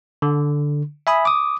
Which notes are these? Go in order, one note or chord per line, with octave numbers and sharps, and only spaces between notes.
D3
E5 G#5 B5 D#6
D6 D#6